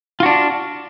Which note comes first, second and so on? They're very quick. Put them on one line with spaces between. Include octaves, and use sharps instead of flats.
F4 F#4 D4